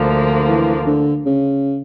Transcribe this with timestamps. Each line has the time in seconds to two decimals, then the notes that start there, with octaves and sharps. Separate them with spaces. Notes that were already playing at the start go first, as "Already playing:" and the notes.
Already playing: D2 D3 F3 A#3
0.48 E3
0.87 D3
1.26 C#3